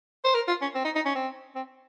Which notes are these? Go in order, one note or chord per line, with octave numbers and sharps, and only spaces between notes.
C5
A#4
F4
C#4
C4
D#4
D#4
C#4
C4
C4